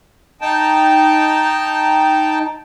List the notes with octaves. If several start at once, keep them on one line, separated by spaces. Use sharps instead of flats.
D#4 G5 A5